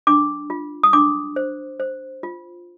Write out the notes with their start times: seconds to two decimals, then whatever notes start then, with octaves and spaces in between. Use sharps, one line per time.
0.07 D4 D6
0.50 F4
0.83 D#6
0.93 D4 D6
1.36 C5
1.80 C5
2.23 F4